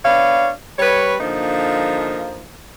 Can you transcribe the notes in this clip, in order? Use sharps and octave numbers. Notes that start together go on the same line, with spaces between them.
B3 D4 C#5 F5
G3 B4 C#5
D3 F3 A#3 D#4